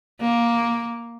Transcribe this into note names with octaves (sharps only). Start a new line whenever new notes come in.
A#3